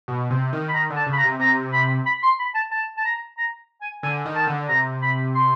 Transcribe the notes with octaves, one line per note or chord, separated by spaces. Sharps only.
B2
C3
D#3
B5
D#3 A#5
D3
A5
C#3
B5
A#5
C3
C3 A#5
B5
B5
C6
B5
A5
A5
A5
A#5
A#5
G#5
D3 G#5
D#3
A5
D3
C3 A#5
B5
C6